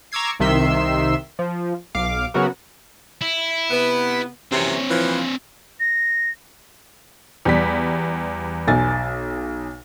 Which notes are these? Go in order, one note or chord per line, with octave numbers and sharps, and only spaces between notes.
A#5 C#6 D6 E6 G#6 C7
C2 C3 D#3 E5 C6 E6
F3
B1 F5 D6
C#3 F#3 B3 F#4 A#4
E4
C3 B3
F#2 C3 E3 C4 C#5
E3 F3
A#6
E2 G3 B6
B1 G#5 A6